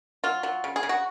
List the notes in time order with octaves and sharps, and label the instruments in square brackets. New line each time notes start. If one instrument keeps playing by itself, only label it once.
[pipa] F#3 F4
F#3
C#3
G#4
C#3
F#4